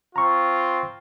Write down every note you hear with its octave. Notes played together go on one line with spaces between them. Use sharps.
C4 F4 A#5 C#6